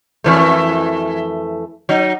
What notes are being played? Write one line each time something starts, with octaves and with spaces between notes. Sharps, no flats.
F2 E3 A3
F#3 D#4